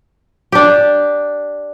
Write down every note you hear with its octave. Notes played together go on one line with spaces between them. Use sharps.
D4 G4